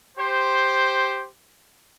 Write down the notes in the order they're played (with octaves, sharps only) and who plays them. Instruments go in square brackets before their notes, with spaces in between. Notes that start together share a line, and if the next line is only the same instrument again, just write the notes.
[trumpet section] G4 C5